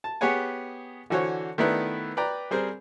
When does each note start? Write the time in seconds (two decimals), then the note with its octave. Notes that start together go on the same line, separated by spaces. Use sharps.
0.04 A5
0.21 B3 G4 G#4 C#5 F#5 G#5
1.10 D3 E3 F#4 C5 C#5
1.58 D#3 A3 B3 D4 E4 B4
2.17 B4 D5 G5 A#5
2.51 G3 C4 G#4 A#4 C5